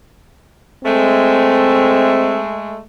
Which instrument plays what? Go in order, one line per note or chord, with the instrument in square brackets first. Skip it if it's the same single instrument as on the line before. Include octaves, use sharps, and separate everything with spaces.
[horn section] G#3 A3 [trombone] C4